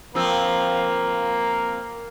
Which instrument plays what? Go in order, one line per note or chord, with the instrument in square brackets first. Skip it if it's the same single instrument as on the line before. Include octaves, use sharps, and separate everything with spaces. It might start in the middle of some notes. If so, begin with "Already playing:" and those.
[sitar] F3 C4 [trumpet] A#3